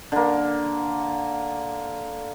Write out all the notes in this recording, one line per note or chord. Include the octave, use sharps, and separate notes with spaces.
D3 A#3